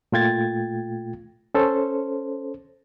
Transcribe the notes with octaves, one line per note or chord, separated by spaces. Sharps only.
A#2 A3 F4 G5 G#6 A6
C#4 A4 C5